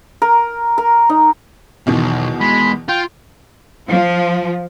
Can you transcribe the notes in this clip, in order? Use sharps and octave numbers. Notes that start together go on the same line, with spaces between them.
A#4
A#4
D#4
B1 E2 B2 D#3
G#3 B5
F4 G5
F3